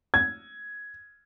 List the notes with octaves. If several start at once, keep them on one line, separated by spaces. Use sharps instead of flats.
G#6